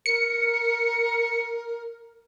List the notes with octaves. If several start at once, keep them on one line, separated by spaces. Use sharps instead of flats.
A#4 C#7